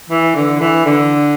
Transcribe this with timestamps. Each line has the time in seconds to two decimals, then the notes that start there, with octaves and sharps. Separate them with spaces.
0.10 E3
0.35 D3
0.60 E3
0.85 D3